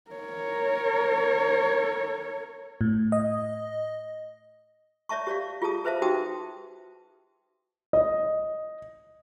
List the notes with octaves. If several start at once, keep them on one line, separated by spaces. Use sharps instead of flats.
A#4 C#5
A2
D#5
C#5 D5 E5 A5 C#6
G4 C#5 D5 F5
F4 G4 G#4 A5 D#6
G#4 B4 C5 E5 F5 A5
D#4 F#4 G4 G5 A5 D#6
D#5